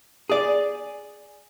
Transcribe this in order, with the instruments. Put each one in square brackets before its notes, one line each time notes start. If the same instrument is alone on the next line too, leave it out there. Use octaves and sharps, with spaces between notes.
[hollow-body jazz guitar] G#4 D5